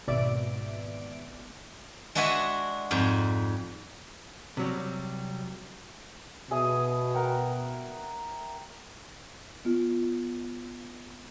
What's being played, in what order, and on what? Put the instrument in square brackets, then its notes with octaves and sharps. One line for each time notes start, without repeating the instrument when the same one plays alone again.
[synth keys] G#1 B2 D5 E5 D7
[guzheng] G#3 D4 F#4 E5 F#5 G#5
F2 G#2
[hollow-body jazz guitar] C3 F#3 G3
[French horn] B2 [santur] G#4 E5 D#6
[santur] A#4 F#5 G5
[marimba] B3 F4